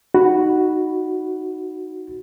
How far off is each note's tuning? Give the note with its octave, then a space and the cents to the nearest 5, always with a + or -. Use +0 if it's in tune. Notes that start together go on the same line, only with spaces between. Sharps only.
D#4 +0 F#4 +0 B5 -5